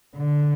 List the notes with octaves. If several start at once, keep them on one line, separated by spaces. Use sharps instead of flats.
D3